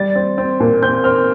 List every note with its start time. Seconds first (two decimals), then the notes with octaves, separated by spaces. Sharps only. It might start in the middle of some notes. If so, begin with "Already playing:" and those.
Already playing: G3 A6
0.15 C4
0.38 C4
0.60 A#2
0.82 C4 G6
1.04 C4 F6